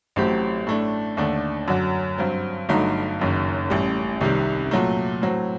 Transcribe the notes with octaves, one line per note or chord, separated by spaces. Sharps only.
A1 A2 F#3 C4 G4
A2 A3 D4
D#2 D3 A3 D4
F#2 D3 F#3
G2 F#3 C4
G1 G2 F#3 A3 D#4
F#1 F#2 D#3
A1 A2 G3
C2 C3 D#3 G3
A#2 F#3 A3
A2 F#3 C4